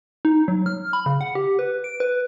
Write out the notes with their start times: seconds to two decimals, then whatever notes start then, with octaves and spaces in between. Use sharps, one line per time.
0.25 D#4
0.48 F#3
0.66 F6
0.93 B5
1.06 C#3
1.21 F#5
1.35 G4
1.59 B4
1.84 D7
2.00 B4